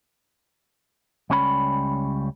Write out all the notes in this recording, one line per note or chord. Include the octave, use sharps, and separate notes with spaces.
C#2 G3 C#4 C#5 F#5 B5